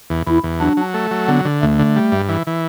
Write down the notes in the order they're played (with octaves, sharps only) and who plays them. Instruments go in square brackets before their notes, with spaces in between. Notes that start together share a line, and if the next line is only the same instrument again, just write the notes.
[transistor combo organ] E2
[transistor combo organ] E2 [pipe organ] E4
[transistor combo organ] E2
[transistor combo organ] F#3 [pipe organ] D4
[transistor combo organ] F#3
A3
F#3
[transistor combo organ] D3 [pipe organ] B3
[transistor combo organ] D3
[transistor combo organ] D2 [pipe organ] A3
[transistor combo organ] D3
G3
G2
E3
E3